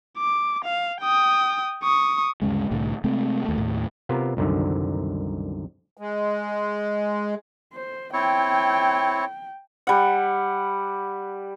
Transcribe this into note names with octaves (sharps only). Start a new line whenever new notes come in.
D6
F5
G5 D#6
C#6 D#6
D2 G2 C#3 G#3
C2 A2 D3
C3 G#3 A3 C4
D#2 A3
D#2 A2
C3 B3 F4 A#4
C2 F#2 D3 D#3
G#3
C5
C4 E4 C#5 G5
G3 F#5